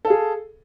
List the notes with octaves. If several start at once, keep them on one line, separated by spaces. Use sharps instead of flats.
G#4 A4 F5